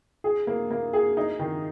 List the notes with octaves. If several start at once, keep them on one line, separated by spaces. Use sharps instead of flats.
G#4
A#3
A#3
G#4
D#4
D#3